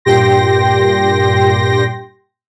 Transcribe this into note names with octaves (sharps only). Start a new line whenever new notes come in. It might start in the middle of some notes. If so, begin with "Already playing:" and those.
G2 A#2 G4 G5 C6 A#6